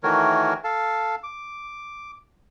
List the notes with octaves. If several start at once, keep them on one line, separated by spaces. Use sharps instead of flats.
D#3 E3 A3 F#4 A#4 C#5
A4 F5 A5
D6